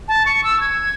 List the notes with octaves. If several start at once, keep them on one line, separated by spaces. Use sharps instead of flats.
A5
C#6
E6
G#6